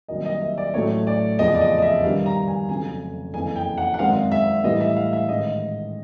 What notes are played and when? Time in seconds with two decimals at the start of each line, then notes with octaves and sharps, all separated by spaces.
0.08 C2 C3 D#3 F#3 A#3 D#5
0.25 D#5
0.41 E5
0.58 D5
0.74 A1 A2 F#3 A3 C#5
1.07 D5
1.39 F1 E2 C#3 F3 D#5
1.55 D5
1.61 D#5
1.78 D#5
1.82 E5
2.04 G2 D#3 G3 B3 F5
2.26 A#5
2.48 G#5
2.69 F1 F2 C#3 F#3 B3 G#5
3.34 F#1 F2 C#3 E3 G#5
3.56 G5
3.78 F#5
3.94 F#5
3.99 G#1 F#2 D#3 G#3 C4 F5
4.32 E5
4.64 A2 E3 G3 D#5
4.80 E5
4.96 F5
5.13 E5
5.29 A1 G#2 D#3 D#5